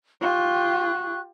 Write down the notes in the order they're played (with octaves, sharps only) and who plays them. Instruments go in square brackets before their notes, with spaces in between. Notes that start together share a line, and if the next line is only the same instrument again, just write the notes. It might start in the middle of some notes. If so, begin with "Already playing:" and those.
[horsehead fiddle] F4 G4 [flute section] C#6 F#6